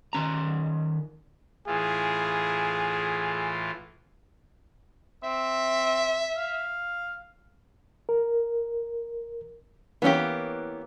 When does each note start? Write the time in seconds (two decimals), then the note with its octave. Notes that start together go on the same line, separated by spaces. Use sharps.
0.13 D#3 C#4 A#5
1.67 A2 E3 F4 G#4
5.23 C4 E5
6.37 F5
8.09 A#4
10.02 E3 A#3 B3 C#4 G4